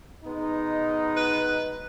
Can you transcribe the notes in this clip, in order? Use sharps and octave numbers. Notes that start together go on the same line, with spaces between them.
B2 G#3 B3 D#4
B4